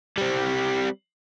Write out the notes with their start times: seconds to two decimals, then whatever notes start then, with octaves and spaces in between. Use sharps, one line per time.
0.18 G3 C4